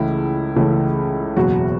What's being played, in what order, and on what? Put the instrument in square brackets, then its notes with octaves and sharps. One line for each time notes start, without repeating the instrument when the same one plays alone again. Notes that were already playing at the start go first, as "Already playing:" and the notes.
Already playing: [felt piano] C#2 C#3 E3 A3 E4
C#2 C#3 E3 A3
F#1 E2 B2 F#3 F#4